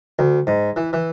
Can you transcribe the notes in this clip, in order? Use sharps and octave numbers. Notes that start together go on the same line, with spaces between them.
D2
G#2
E3
E3